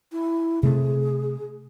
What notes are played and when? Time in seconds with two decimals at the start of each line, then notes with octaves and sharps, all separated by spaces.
0.12 E4
0.63 C3 A3 G#4